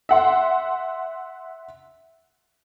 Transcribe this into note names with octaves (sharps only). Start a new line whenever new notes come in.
E5 F#5 C6